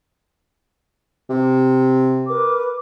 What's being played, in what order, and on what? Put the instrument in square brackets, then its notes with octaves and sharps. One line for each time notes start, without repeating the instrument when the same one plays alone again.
[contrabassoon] C3
[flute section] A#4 B4 D6